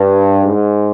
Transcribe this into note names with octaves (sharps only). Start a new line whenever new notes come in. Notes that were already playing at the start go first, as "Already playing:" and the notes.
Already playing: G2
G#2